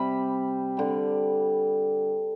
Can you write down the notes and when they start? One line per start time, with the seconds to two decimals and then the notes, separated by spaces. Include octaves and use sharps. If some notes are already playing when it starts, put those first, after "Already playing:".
Already playing: C3 G3 B5
0.77 D3 G3